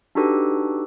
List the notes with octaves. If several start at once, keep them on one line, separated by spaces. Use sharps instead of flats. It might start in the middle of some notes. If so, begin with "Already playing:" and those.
D4 D#4 F#4 G4 A4 B4